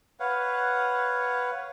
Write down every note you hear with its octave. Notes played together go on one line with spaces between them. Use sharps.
B4 C#5 F5 F#5